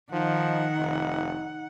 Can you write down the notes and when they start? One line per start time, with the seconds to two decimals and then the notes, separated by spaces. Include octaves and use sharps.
0.12 D#3 F3 D#4 F#5
0.78 F1